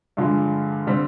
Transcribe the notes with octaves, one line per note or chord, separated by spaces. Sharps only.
G2 D3 F3 G#3
D3 G3 C4